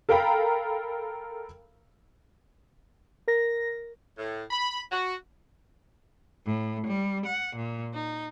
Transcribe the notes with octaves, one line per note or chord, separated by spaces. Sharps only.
A4 A#4 F5 G5 A#5 B5
A#4 A#6
A2
B5
F#4
A2
G3
F#5
A#2
D#4